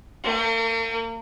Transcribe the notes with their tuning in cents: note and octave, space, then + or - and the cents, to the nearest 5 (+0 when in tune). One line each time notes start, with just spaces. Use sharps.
A#3 -45